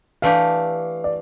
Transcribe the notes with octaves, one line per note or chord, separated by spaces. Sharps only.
E3 A3 D4 G4 F5
D5